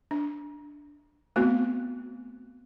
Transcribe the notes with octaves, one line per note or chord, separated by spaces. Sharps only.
D4
A3 B3 C4 F#4